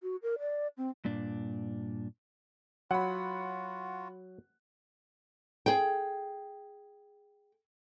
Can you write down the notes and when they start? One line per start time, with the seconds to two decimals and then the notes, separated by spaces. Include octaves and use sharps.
0.03 F#4
0.23 A#4
0.39 D5
0.77 C4
1.05 G2 A#2 D4
2.91 F#3 F4 F#4 F#5 B5
5.66 G#4 G5